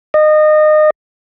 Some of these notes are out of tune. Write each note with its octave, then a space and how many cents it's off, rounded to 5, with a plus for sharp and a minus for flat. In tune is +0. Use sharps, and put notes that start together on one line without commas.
D#5 -25